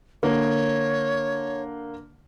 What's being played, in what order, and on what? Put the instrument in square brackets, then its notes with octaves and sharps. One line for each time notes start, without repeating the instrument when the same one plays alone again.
[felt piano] D3 A#3 [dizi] C#5